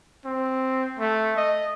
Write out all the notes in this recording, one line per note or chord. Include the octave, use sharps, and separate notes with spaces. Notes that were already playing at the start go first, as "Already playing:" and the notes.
C4
A3
D#5